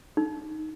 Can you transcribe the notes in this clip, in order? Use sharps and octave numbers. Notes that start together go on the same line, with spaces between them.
D#4